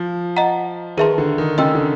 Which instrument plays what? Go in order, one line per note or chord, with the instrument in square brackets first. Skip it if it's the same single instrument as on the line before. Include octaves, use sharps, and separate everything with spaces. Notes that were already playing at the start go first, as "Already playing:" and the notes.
Already playing: [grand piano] F3
[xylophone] D#5 F#5 A#5
[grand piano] D#3 [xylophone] G#4 B4 E5 A5 C6
[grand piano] D3
D#3
[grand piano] C#3 [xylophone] D#5 G5 C6 E6
[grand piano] D3